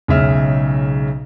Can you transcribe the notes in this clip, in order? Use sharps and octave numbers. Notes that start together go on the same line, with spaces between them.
B1 C#3 G#3 E5 F6